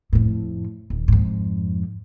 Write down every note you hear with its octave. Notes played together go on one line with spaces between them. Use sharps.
F2 A2
D#1
F2 G#2